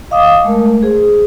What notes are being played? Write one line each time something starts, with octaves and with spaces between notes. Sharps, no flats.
D#5 F5 D6 D#6
G#3 A3 A#4
G#4 C5